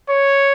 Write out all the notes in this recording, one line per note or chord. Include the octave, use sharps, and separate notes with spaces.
C#5